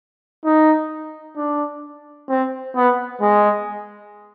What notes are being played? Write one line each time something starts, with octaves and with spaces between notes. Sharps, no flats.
D#4
D4
C4
B3
G#3